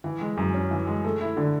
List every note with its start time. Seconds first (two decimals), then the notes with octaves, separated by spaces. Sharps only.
0.04 E3
0.21 G#3
0.37 F#2
0.54 C#4
0.71 E3
0.87 G#3
1.04 A3
1.21 E4
1.37 D3